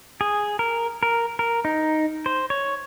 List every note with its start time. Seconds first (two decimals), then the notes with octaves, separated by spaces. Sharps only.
0.21 G#4
0.59 A#4
1.03 A#4
1.39 A#4
1.65 D#4
2.26 C5
2.50 C#5